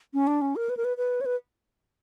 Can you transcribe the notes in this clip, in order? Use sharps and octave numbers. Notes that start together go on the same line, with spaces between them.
C#4
D4
C#4
A#4
B4
A#4
B4
B4
C#5
B4